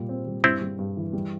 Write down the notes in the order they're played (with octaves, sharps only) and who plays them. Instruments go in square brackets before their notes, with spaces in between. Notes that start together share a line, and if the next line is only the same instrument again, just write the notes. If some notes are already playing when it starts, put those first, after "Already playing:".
Already playing: [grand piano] A#2 G3
C4
G3
[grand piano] G2 [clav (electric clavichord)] C4 E4
[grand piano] G3
G2
E3
G3